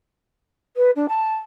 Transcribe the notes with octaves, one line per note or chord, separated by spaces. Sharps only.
B4
D4
A5